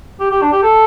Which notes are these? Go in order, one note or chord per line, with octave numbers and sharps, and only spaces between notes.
G4
G4
D4
G4
A4